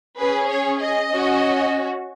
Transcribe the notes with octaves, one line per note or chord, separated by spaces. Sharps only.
C#4 G#4 B4
C#5
D#5
C#4 F#4